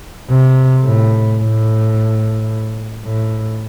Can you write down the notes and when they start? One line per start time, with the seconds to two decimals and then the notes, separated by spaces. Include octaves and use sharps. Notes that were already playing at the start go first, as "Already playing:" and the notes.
0.29 C3
0.83 A2
1.40 A2
3.05 A2